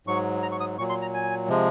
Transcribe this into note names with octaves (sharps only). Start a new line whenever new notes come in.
G#2 F#3 C#6
A#5
C#6
D#6
A#2 F#3 C#6
C6
A#5
G#5
C3 F3 G#3